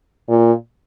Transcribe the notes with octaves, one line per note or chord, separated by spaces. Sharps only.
A#2